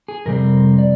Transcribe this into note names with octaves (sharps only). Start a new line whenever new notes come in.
G#4
F2 C3 G3 C4 A#4
D5